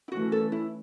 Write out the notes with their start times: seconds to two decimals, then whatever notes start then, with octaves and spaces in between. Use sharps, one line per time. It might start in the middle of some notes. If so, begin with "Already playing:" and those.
0.08 E4
0.12 E3 A3 C#4 F#4
0.32 A4
0.52 E4